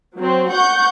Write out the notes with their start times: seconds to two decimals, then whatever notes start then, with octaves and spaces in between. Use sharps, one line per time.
0.16 F#3 C4
0.51 F#5 C#6 G6